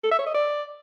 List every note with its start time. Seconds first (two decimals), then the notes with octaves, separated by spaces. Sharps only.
0.03 A4
0.11 E5
0.19 C#5
0.26 D#5
0.34 D5